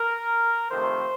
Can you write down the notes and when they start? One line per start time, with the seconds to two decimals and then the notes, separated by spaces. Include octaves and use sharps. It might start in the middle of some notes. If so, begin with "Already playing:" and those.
Already playing: A#4
0.70 F2 C3 D#3 A3 C5